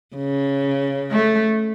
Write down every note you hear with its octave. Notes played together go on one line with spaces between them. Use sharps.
C#3
A3